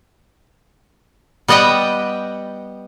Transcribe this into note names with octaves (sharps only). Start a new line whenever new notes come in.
G3 B3 D#5 F#5 G5